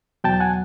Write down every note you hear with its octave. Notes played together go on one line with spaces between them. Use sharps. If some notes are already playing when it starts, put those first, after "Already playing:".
E2 B2 F#3 G5 A5
F#5 G#5